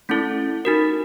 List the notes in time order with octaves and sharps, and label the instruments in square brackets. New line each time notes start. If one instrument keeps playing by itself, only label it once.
[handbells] A3 C#4 E4 A4
D#4 F#4 A#4